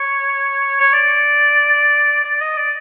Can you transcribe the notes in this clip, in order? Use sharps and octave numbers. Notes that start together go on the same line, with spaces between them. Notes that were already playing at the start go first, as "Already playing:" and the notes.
Already playing: C#5
C#5
D5
D5
D#5
D5